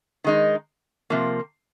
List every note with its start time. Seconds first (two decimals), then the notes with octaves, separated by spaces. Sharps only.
0.24 D#3 G#3 D#4
1.10 C3 F3 A#3